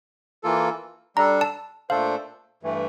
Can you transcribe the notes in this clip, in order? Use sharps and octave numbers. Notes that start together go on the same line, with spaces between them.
E3 A#3 F4 A4
G3 D4 A4 A#5
A5
A#2 A3 D4 A4 C5 F5
G2 E3 A3